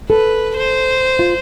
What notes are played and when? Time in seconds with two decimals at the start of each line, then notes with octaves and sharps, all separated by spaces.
0.10 A4 B4
0.57 C5
1.19 F4